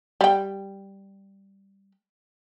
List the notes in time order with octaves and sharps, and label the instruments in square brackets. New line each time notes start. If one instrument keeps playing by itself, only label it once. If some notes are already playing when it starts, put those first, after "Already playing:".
[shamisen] G3 G5